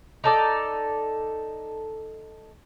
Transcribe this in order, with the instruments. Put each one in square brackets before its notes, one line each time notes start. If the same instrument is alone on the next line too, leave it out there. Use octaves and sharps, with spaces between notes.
[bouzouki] D#4 A4 D5